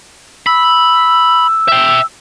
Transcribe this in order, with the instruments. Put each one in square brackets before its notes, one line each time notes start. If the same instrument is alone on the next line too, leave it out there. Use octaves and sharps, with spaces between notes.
[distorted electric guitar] B5 [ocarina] E6
[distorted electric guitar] E5 G5